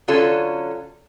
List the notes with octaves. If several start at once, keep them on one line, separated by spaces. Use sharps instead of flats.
D3 F#3 C#4 F4 A4